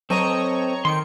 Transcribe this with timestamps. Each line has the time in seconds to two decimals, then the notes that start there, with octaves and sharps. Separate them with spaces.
0.10 F#3 C4 A4 C#5 D#5 A#5 C#6
0.85 D#3 G5 C6 C#7